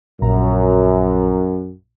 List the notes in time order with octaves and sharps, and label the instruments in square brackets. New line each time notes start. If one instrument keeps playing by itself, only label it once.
[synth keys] A#1 A#2 A#5 [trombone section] F#2